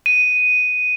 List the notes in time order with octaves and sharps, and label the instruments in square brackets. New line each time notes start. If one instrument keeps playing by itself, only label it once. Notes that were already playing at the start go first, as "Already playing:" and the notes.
[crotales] D#7